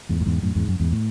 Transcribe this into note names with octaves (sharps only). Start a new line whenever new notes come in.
E2 G#2
A2
E2 G#2
F#2 A2
E2 G#2
F#2
E2 G#2
A2